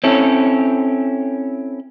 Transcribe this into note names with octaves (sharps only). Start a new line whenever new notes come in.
C4 C#4 E4 A4 C#5